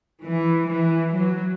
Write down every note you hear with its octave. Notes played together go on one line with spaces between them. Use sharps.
E3
E3
F#3